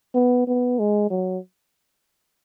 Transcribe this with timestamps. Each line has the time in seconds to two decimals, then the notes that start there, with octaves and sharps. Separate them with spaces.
0.14 B3
0.47 B3
0.79 G#3
1.10 F#3